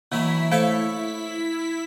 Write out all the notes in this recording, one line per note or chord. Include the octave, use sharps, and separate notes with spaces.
D#3 E3 F#3 A#3 E4 B6
A3 A4 C5 C#5 F5 A5